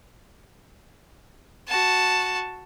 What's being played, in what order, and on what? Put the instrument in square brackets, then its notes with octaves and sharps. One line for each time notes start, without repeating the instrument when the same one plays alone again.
[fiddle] F#4 A5